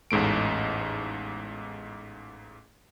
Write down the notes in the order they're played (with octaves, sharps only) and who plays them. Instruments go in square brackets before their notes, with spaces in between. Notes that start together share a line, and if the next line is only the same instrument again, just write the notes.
[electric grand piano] A1 E2 G#2 A3 D7